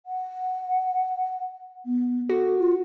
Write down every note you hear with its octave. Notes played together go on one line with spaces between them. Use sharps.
F#5
B3
F#4 A4
F4